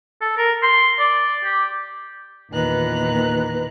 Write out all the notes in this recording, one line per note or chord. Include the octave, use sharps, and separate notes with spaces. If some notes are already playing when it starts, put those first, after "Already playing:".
A4
A#4
C6
D5
G4
E2 A#2 D#3 B4 A#5 F#6